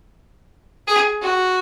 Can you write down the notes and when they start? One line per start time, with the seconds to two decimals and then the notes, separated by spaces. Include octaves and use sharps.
0.87 G#4
1.21 F#4